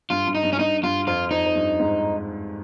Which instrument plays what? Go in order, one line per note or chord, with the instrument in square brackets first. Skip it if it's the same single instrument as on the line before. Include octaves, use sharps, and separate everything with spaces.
[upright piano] G2 [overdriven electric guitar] F4
[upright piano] G2
[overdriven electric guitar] D#4
[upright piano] G2
[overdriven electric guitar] C#4
[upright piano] G2 [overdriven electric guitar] D#4
[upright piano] G2 [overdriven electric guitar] F4
[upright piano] F2 [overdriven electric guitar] F4
[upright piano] F2 [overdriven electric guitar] D#4
[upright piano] F2
G2
G#2